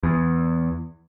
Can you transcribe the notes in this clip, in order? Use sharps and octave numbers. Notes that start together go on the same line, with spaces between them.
E2